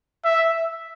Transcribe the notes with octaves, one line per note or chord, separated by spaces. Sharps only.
E5